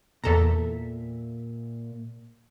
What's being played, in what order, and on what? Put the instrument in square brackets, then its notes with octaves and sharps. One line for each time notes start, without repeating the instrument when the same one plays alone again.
[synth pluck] E2 A4 A#5 [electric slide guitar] A#2 E5